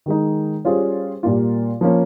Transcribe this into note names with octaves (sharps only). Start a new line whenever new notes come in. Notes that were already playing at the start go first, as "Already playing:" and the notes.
D#3 G#3 D#4
G3 C#4 F4 G#4 C5
A#2 G3 A#3 F4
F3 A#3 C#4